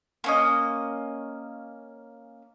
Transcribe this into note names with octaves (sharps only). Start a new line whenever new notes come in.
A#3 C#4 D#5